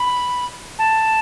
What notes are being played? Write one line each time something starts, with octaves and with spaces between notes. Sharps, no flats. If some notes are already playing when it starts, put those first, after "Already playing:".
Already playing: B5
A5